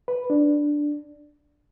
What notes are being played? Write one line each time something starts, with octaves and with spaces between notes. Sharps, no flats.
B4
D4